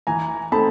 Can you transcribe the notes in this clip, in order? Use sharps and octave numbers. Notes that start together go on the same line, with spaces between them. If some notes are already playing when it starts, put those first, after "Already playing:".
E3 G#5 A#5
A3 C4 D#4 A5 B5